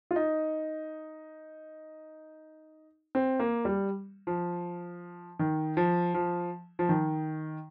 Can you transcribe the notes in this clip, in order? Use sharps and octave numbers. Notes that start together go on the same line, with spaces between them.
F4
D#4
C4
A#3
G3
F3
D#3
F3
F3
F3
D#3